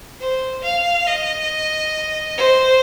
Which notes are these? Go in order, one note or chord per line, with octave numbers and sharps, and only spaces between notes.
C5
F5
D#5
C5